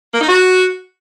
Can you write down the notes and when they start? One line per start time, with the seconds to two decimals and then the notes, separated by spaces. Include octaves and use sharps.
0.14 A#3
0.21 D#4
0.29 F#4